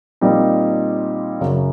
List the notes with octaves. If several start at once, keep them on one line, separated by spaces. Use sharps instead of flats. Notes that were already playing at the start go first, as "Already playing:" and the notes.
A#2 G3 C4 D#4
F#2 C#3 F#3